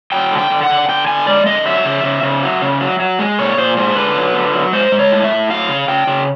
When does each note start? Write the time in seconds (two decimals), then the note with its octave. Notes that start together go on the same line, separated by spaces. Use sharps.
0.12 F#3 G5
0.31 D3
0.38 G5
0.50 D3
0.63 F#5
0.70 D3
0.89 D3 G5
1.07 D3 G#5
1.27 G#3 D5
1.46 D3 D#5
1.66 F#3 E5
1.85 C#3
2.04 C#3
2.23 C#3
2.43 F#3
2.62 C#3
2.81 F#3
3.00 F#3
3.19 G#3
3.39 A#2 C#5
3.57 A#2 C5
3.77 G#3 C5
3.96 D3 B4
4.15 F#3
4.34 D3
4.54 F#3
4.73 G#3 C5
4.92 G#3
4.99 C#5
5.12 A2
5.24 E5
5.31 A2
5.50 F#3 F5
5.69 C#3
5.88 C#3 G5
6.07 C#3